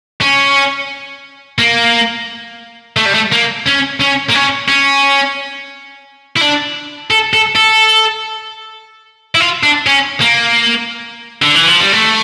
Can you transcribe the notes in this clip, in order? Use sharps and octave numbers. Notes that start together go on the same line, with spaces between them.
C#4
A#3
A3
G3
A3
A#3
C#4
C#4
A#3
C#4
C#4
E4
D4
A4
A4
A4
E4
F4
D4
C#4
A#3
D3
E3
F3
G3
A3